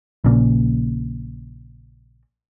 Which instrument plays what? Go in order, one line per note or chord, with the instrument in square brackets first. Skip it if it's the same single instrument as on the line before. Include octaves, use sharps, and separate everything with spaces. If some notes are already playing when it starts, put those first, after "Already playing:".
[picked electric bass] A#1 A#2 C#3 A#3